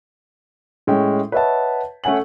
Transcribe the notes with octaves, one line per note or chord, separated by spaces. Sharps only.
A2 G#3 C#4 G5
B4 C#5 D#5 E5 F#5 A5
A3 C#4 F#5 G#5 F#7